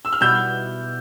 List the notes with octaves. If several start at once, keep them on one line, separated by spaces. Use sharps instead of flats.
E6
F6
B2 G3 B3 E4 E6 G6